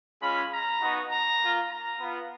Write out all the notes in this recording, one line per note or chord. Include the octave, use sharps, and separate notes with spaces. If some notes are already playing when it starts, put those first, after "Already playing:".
G#3 C#4 F4 B5
A#5
B3 D#4 F#4
A#5
A#3 F4
A#5
B3 F4